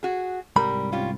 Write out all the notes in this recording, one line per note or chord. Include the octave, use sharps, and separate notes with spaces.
F#4 G#4
C2 G#2 G3 A#4 B5
C#4 F4 G4